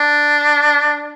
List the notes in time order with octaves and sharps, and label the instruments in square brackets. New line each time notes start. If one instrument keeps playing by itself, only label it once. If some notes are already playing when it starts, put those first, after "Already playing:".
Already playing: [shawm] D4